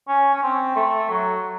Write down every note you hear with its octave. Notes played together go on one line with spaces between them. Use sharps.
C#4
C#4
C4
A3
F#3